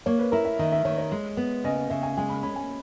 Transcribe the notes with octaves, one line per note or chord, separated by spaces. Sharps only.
A#3 C#5
B4
E4 A#4
E5
D#3 D#5
E5
D#3 C#5
C#5
G#3
B3
C#3 D#5
D#5
C#3 E5
G#5
G#3 G#5
B5
C#4 B5
G#5